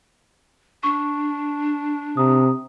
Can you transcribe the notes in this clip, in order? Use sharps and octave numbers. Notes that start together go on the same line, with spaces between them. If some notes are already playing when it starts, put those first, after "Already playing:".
D4 C#6
C3 A#5 D#6